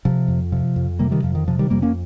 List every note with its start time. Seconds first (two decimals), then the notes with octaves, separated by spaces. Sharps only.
0.05 C3 F3
0.28 F2
0.52 C3 F3
0.76 F2
0.99 C3 G3 A#3
1.11 D#3 G3
1.23 F2 F3
1.35 D#3
1.48 C3 F3
1.59 D#3 G3
1.70 F2 G3 A#3
1.82 A#3 C#4